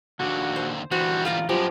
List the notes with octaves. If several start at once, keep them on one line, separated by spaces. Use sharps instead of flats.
D#2 A#2 D3 D4 F#4
C5
A#2 D3 E3 G3 B3 F#4 C5
F4 D5 F5 A#5
G2 F3 F#3 G#3 B3 G4